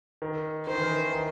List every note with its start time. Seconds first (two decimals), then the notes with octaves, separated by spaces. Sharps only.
0.22 D#3
0.67 D#3 C5
0.75 E3
0.83 D#3
1.13 D#3